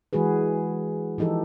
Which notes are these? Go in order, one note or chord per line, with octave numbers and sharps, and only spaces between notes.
E3 G#3 F#4 G#4 B4
E3 F3 D#4 G4 A4